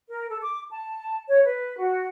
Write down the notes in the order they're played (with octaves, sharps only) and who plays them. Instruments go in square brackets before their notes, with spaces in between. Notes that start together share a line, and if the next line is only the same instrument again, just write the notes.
[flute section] A#4
A4
D6
A5
C#5
B4
F#4